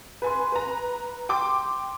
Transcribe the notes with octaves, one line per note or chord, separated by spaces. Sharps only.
B4 G#5 C6
B4 A#5
G5 C6 D6